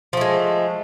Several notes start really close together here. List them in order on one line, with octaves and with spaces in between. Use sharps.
F3 A3 G#3